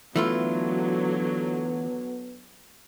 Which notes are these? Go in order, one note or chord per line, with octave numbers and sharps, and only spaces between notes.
D3 E3 F#3 A3 B3 F4